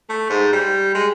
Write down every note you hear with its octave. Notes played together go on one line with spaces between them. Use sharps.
A3
G#2
G3
G#3